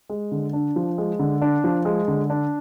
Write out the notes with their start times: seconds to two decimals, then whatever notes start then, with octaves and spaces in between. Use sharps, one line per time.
0.09 G#3
0.32 D3
0.53 D4
0.76 F3
0.98 G#3
1.19 D3
1.41 D4
1.64 F3
1.85 G#3
2.08 D3
2.30 D4